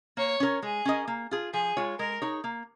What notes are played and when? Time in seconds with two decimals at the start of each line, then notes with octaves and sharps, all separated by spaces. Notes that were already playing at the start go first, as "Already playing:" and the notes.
0.17 A#3 C#5
0.40 C#4 A#4 C#5
0.62 G#3 G#4
0.85 C#4 A#4 D#5
1.08 A#3
1.31 F4 G#4
1.53 F3 G#4
1.77 G#3 F4 C#5
1.99 G#3 A#4
2.22 D#4 G#4 C#5
2.44 A#3